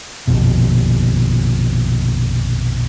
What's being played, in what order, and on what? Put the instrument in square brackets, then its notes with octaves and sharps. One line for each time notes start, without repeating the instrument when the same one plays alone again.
[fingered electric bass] A#1 F2 B2